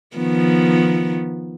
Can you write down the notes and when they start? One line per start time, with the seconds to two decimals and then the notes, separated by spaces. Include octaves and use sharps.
0.17 D#3 F3 B3